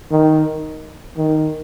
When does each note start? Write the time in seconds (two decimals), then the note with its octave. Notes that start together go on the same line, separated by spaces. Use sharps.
0.11 D#3
1.17 D#3